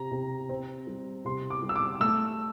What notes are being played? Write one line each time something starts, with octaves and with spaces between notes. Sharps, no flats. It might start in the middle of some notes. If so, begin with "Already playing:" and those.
Already playing: C3 A#5
C3
C4
G3
C3 C6
D6
G3
E6
D6
A3 E6